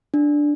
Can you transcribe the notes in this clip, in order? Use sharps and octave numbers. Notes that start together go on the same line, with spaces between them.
D4